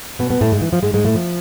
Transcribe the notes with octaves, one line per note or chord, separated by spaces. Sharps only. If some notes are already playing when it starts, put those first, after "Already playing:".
B2 B3
B3
A2 A3
G#2 G#3
E3
F3
G#2 G#3
G#2 G#3
A2 A3
F3